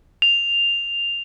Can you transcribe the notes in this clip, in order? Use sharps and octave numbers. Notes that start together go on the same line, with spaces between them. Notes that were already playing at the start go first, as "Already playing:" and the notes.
F7